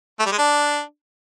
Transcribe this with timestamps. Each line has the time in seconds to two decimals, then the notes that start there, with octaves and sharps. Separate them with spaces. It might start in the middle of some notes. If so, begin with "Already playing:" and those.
0.19 A3
0.26 G3
0.32 G#3
0.38 D4